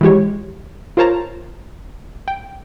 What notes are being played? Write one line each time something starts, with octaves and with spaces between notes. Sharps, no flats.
E3 F3 G#3 G4 C#5
F4 A#4 C5 C#5 A5 A#5
G5